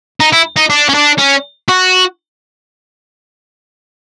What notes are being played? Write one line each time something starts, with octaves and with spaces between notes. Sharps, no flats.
D#4
E4
D#4
D4
C#4
D4
C#4
F#4